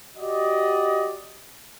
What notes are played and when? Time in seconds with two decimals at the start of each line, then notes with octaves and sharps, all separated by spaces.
0.17 F#4 G4 D5 D#5